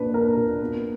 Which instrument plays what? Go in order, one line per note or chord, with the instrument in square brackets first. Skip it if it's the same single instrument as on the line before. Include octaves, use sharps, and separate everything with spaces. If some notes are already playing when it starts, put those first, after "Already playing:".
Already playing: [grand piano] A#2 D4 [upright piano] B4
[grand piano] A#3 [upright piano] A#4
[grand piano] A#2
B3